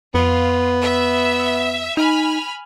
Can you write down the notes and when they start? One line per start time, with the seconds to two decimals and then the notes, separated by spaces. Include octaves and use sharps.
0.14 F2 B3 F4
0.82 E5
1.97 D#4 G#5 B5 F6